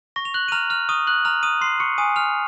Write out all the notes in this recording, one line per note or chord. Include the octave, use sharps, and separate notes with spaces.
C#6 A#6
F7
F#6 F#7
D#7
A#5 F6 F7
F6 F7
C#6 D#6 D#7
F#6 F#7
A#5 F6 F7
D#6 D#7
C6 D#6 C7
C#6 C#7
G#5 D#6 D#7
F6 F7